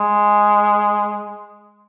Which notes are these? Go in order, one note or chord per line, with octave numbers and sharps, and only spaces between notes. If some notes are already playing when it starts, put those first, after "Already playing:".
Already playing: G#3